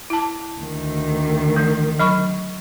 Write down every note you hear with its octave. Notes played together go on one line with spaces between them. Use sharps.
E4 A5
D2 D#3
E3 A3
F#3 B5 C#6